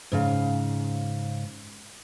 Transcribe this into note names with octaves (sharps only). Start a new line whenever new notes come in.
G#2 C#3 F5